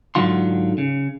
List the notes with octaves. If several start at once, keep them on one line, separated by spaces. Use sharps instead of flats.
G#2 D3 E3 F#3 F4 C6
C#3